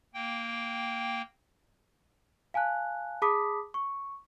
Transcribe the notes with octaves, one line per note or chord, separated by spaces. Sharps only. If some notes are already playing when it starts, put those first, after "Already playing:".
A#3 G5
F5 G#5 A5 F#6
G#4 A5 B5 D6 D#6 B6
C#6